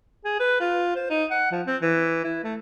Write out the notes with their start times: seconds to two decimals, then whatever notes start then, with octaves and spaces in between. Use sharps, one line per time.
0.24 G#4
0.40 B4
0.60 F4
0.95 C5
1.10 D#4
1.30 F#5
1.51 F3
1.67 C4
1.81 E3
2.24 E4
2.43 A3